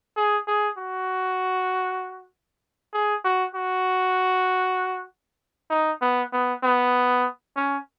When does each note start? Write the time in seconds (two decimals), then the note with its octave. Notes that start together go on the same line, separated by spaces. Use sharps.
0.17 G#4
0.47 G#4
0.77 F#4
2.93 G#4
3.24 F#4
3.55 F#4
5.71 D#4
6.01 B3
6.32 B3
6.63 B3
7.56 C#4